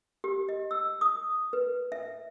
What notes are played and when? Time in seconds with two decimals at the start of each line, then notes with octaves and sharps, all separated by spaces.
0.24 G4
0.49 D#5
0.71 E6
1.01 D#6
1.53 B4
1.92 E5